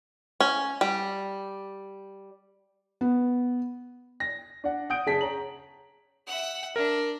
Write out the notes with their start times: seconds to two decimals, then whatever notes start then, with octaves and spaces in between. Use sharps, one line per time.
0.40 C#4
0.81 G3
3.01 B3
4.20 A#6
4.64 D4 F#5
4.90 F#5 D#6 G6 D7
5.06 F#1 G#4 A5 B6
5.21 C#5 A#5 F#7
6.27 E5 F#5
6.76 D4 A#4